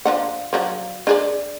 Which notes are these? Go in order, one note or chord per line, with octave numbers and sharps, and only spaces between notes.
F3 D4 F#5
F3 F#3 D4
D4 G#4 D5